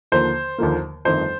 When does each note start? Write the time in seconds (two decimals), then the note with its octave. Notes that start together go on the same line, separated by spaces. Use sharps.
0.12 D#2 D3 F3 A#3 C5
0.58 D#2 D3 F3 A#3
1.05 G1 F2 D#3 A3 C5